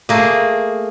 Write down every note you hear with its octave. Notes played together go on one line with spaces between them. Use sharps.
A3 A#3 G#4